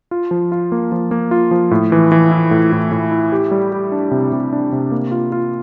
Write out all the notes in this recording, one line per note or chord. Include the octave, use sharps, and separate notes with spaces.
F4
F3
F4
A#3
F3
A#3
F4
F3
A2
E3
E3
E4
A2
A2
A2
E4
G4
G3
G4
D4
C3
C3
D4
C3
A#3
F4
F4